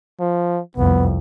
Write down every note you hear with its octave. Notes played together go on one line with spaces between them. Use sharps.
F3
C2 F2 B3